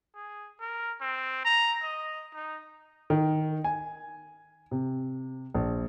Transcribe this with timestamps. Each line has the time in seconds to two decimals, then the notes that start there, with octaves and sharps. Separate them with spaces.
0.15 G#4
0.60 A#4
1.01 C4
1.45 A#5
1.83 D#5
2.34 D#4
3.10 D#3
3.64 G#5
4.71 C3
5.54 A#1